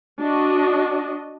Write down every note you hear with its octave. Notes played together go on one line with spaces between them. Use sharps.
D4 F#4 D#5